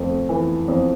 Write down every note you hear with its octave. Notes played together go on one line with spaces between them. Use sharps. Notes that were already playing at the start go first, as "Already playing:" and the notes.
Already playing: F2 A3
E3
F2